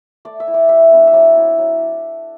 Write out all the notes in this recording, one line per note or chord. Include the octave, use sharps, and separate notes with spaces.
A3 D5
E5
E4
D5
G3 E5
B3 D4
E5
F#3 D5
C4 E4
F#3